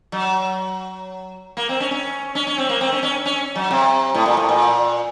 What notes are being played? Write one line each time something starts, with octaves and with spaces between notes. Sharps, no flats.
F#3
A#3
C4
C#4
C#4
C#4
C#4
C4
A#3
C4
C#4
C#4
C#4
F#3
C3
A2
A#2
A2
A#2